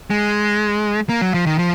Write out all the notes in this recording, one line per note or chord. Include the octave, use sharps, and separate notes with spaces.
G#3
A#3
F#3
F3
D#3
F3